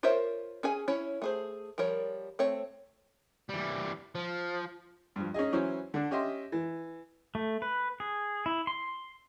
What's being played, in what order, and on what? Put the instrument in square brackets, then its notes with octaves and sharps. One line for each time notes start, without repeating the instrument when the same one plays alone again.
[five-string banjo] F4 A#4 C5 C#5 E5
C#4 G#4 G#5
C#4 E4 C#5
A3 G#4 C5
F3 G3 A#4 C#5
A3 C4 C#5
[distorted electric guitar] E3 G3
F3
[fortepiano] G2 F3
C#4 D#4 G#4 D#5
E3 F#3 C#4 E4 C5
D3 D4
C#4 G4 D#5 E5 C6
E3
[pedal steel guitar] A3
B4
G#4
E4
C6